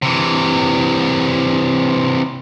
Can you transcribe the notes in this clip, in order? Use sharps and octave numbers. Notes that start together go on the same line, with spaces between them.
C3 E3